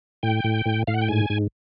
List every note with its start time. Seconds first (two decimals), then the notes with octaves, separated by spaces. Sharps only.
0.23 A2 G5
0.44 A2
0.66 A2
0.87 A2 F5
0.94 F#5
1.01 G5
1.08 G#2 G#5
1.30 G#2